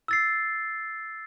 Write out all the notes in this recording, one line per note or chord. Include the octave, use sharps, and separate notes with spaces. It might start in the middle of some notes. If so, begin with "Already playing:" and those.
E6 A6 C7